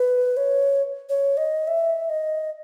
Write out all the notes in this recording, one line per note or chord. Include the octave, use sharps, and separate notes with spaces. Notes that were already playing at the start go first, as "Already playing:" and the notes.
Already playing: B4
C#5
C#5
D#5
E5
D#5